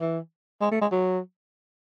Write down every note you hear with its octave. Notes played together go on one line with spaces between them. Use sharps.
E3
G#3
A3
G#3
F#3